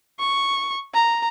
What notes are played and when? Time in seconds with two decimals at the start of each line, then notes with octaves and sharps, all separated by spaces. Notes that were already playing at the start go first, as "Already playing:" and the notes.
0.20 C#6
0.94 A#5